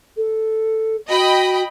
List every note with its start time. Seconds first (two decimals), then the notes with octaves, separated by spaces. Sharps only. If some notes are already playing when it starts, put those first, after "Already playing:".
0.17 A4
1.09 F#4 D#5 G5 B5